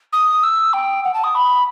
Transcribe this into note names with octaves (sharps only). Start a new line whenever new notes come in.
D#6
E6
G5
F#5
A5
D#6
B5